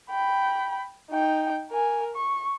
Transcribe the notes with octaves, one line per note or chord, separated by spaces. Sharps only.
G5 B5
D#4 G5
A#4 G#5
C#6